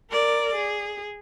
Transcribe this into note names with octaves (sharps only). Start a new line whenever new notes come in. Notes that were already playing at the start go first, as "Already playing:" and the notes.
A#4 D5
G#4